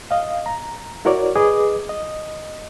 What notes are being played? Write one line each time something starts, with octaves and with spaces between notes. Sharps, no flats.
D#5 F5
A#5
E4 F#4 A#4 C#5 D5
G#4 B4 D#5 D6 D#6
D#5